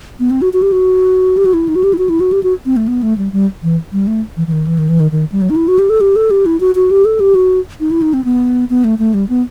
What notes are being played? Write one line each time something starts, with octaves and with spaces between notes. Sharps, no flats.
B3
C4
F#4
F#4
G4
F#4
G4
F#4
E4
D#4
F#4
G4
E4
F#4
E4
F#4
G4
F#4
C4
A3
B3
A3
G3
G3
E3
G3
A3
E3
E3
D#3
E3
D#3
E3
D#3
D#3
G3
F#3
D#4
E4
F#4
G4
A4
G4
A4
G4
E4
F#4
F#4
G4
A4
G4
F#4
D#4
E4
D#4
C4
B3
B3
A3
A3
G3
B3